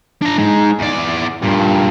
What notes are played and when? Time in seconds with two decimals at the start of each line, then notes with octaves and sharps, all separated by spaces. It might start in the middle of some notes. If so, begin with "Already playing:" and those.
0.22 D4 A#5
0.38 G#3 D#4
0.79 E2 D5
1.43 G2 A#2